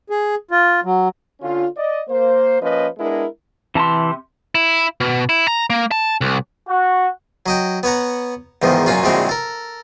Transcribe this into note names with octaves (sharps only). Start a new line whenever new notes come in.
G#4
F4
F#3
D3 C#4 F4
D5 D#5
A#3 C5
F3 A#3 C#4 B4 D#5
G#3 B3 D4 E4 A#4
C3 E3 A5 A#5 C6
E4
B2
E4
A#5
A#3
A5
C2
F#4
F#3 D#5 G5
B3 C#5 F#5 A#5
E2 G#2 D#3 F3
F#2 A#2 C#4 F4 F#4
A#1 A2 D3 G#3 C4 F#4
A4 A#4